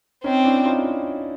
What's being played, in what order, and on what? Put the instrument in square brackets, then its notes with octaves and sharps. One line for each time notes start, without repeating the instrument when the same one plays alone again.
[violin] C4 [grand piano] C#4 D#4
[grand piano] D4 E4
D#4 F4